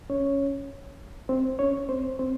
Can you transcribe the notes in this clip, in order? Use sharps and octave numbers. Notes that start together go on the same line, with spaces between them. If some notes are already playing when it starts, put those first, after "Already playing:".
C#4 C#5
C4 C5
C#4 C#5
C4 C5
C4 C5